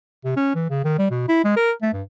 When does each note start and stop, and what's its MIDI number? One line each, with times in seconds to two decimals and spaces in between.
0.25 0.34 48
0.36 0.50 61
0.55 0.66 52
0.70 0.81 49
0.84 0.97 51
0.98 1.06 55
1.10 1.28 47
1.28 1.39 64
1.44 1.56 56
1.56 1.72 70
1.82 1.92 57
1.93 2.02 43